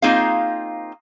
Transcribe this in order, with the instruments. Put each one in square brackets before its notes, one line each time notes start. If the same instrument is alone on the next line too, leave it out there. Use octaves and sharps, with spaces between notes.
[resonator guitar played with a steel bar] A#3 C4 D#4 F4 G#4 F5